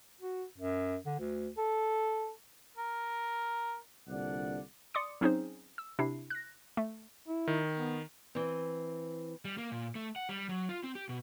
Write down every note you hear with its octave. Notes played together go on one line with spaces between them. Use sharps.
F#4
F#2
D3
D2
A4
A#4
C2 A#2 D3 D4 D5 F#5
D5 C6 D6 D#6 C#7
F#3 C4 C#4 D#4 G#4 C5
E6
C3 D4 E4 C7
F#6 A#6
A3
E4
D#3
B3
E3 C4
G3
A#3
A#2
A3
F#5
G3
F#3
F4
C4
G4
B2